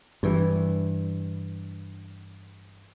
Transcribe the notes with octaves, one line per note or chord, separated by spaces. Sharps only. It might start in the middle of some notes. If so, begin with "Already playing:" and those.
G2 E3